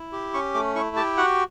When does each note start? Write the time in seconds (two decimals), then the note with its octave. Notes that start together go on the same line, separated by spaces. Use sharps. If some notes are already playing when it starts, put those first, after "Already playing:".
Already playing: E4
0.13 G4
0.34 C#4 C#6
0.54 A3 D6
0.75 E4 C#6
0.96 G4 A5
1.17 F#4 F#5